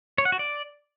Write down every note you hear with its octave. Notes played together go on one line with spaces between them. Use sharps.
C#5
F#5
F#4
D5